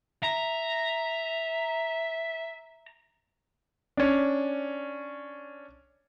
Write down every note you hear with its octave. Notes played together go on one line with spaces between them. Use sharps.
E5 A#5
C#4 D4